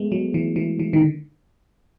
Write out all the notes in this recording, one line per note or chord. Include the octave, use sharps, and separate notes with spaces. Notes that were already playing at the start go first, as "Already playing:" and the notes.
Already playing: G#3 A3 B3
F#3
E3
E3
E3
D#3
D3